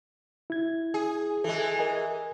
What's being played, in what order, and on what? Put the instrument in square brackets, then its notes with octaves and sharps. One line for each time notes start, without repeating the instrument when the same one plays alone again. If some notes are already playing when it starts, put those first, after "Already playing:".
[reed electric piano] E4 G#6
[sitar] G#4
[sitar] E3 G#3 [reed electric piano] G#4 A4
[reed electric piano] A#4 D#5 G#5